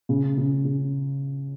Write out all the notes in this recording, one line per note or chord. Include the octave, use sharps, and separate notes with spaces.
C#3
C#3
C#3